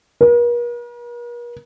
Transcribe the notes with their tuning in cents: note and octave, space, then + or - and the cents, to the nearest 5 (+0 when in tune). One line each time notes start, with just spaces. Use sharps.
A#4 +45